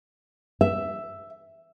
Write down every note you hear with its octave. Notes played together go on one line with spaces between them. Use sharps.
E5